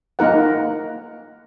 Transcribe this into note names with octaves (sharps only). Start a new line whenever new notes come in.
A#3 D#4 A#4 F#5